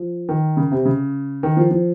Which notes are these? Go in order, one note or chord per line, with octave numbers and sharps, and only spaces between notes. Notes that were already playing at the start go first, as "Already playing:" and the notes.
Already playing: F3
D#3
C#3
C3
C#3
D#3
F3
F3